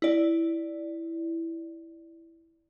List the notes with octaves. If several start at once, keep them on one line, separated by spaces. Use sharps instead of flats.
E4 D5